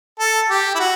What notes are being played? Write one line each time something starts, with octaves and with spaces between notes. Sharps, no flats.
A4
G4
E4
F#4